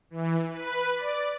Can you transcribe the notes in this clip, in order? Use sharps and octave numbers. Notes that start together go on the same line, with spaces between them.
E3
B4
D5